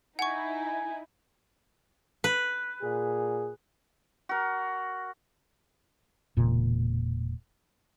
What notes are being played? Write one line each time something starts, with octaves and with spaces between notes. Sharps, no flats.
D#4 E4 F#5 G#5 C#6
B4
A#2 G#4
F#4 A#4
E1 A#2 C#3